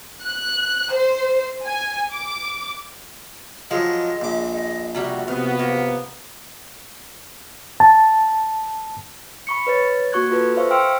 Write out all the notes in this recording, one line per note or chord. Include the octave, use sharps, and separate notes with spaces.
F#6
C5
G#5
D6
F3 F#3 G#3 D#5
A#1 D6
D#5
C3 G3 A#3 F#4
C3 B3 F5
A#3
A5
B5 C#6 C#7
B4 C#5 A6
A#3 F#4 C#6 F#6 G#6
F4 A4 B4
C5 E5 F5 C#6
F5 G5 C6 E6 F6 D7